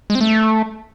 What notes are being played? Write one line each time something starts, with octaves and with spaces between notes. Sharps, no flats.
G#3
C4
A3